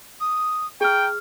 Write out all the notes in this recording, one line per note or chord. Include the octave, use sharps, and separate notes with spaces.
D#6
G#4 G5 A#5 F6